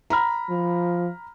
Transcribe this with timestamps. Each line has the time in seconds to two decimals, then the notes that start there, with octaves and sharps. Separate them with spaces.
0.10 A#5 B5 F6
0.50 F3